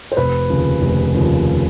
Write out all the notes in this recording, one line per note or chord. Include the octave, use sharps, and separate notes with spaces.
C5
F1 B4
D#2 C#3 F3
F1
D#2 C#3 F3